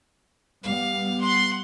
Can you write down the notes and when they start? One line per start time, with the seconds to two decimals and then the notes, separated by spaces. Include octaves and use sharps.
0.63 G3 B3 F5
1.21 F#5 C6